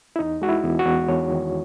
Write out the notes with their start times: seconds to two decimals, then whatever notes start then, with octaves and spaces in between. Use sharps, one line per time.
0.16 E4
0.19 E2 D#4
0.42 G#3 F#4
0.49 E4
0.63 E2
0.79 F#4
0.86 E2
1.09 E2 C#5
1.31 D#3